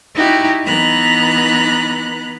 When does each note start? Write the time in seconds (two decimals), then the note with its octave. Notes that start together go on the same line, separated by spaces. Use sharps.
0.14 D#4 E4 F#4 G4
0.64 E3 B3 D#4 A#5 B5 F#6